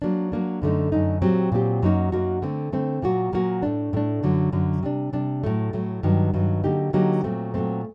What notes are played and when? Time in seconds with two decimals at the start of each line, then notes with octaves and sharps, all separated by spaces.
0.02 F#3 A#3 D4
0.32 F#3 A#3 D4
0.62 F#2 D3 A3 D#4
0.92 F#2 D3 A3 D#4
1.22 A#2 F#3 C4 G4
1.52 A#2 F#3 C4 G4
1.82 F#2 F#3 A#3 D#4 F#4
2.12 F#2 F#3 A#3 D#4 F#4
2.42 D3 A3 C4
2.72 D3 A3 C4
3.02 A#2 F#3 A#3 F#4
3.33 A#2 F#3 A#3 F#4
3.63 A2 A3 D4
3.93 A2 A3 D4
4.23 F#2 D3 F#3
4.53 F#2 D3 F#3
4.83 C3 G3 D4
5.13 C3 G3 D4
5.44 A2 F#3 A3
5.73 A2 F#3 A3
6.03 G2 D#3 F#3
6.34 G2 D#3 F#3
6.64 D3 F#3 A#3 D#4 G4
6.93 D3 F#3 A#3 D#4 G4
7.24 A#2 F#3 A3 C4
7.54 A#2 F#3 A3 C4